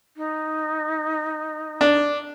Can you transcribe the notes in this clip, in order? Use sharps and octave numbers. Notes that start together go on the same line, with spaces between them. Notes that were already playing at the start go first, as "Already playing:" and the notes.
D#4
D4